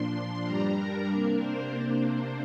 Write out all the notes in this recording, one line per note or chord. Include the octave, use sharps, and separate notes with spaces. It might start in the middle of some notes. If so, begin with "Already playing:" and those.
Already playing: A#2 F3 D4 C6
C6
G2 G3 D4 A#5
A#4
C3 A#3 D4 A#4
C5
C3 A#3 D4